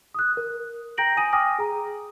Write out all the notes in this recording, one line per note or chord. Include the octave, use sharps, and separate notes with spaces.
D#6 F#6
A#4
G5 A#5 G6 A#6 D7 F#7
G#5 D#6 D#7
G5 G#5 D6 D#6 F6 A#6
G#4 A#5